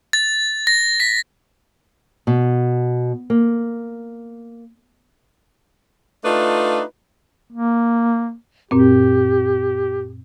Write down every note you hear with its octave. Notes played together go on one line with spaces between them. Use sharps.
A6
A#6
B6
B2
A#3
A3 D4 D#4 F4 B4
A#3
F#2 A#2 C4 G4